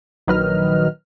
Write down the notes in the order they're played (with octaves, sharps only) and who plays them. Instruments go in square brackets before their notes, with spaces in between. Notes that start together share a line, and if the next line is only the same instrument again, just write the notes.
[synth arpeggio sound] A#1 D#3 F#3 B4 D#5 F6